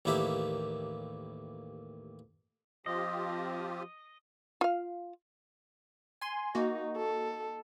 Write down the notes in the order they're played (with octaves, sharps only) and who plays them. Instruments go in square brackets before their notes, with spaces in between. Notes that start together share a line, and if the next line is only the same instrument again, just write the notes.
[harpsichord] A1 D#2 A#3 E4 G4 E5
[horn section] F3 [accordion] C4 F4 G4 [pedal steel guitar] D#5
[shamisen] F4 F5
[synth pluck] G#5 C6
[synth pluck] A#3 F#4 [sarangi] D#4
[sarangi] A4